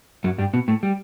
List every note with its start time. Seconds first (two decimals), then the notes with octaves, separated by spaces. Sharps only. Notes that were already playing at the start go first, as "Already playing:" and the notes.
0.24 F#2 F#3
0.38 G2 G3
0.54 B2 B3
0.68 A2 A3
0.83 G3